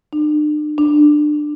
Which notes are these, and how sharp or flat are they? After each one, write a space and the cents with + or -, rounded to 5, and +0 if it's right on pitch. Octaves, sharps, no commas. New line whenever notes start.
D4 +40
D4 +20